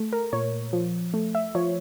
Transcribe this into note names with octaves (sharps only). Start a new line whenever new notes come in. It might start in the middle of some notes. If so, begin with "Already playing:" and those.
Already playing: A3
A#4
A#2 C#5
F3
A3
E5
F3 C#5